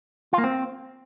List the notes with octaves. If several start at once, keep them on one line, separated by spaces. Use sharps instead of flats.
F4
A#3
C4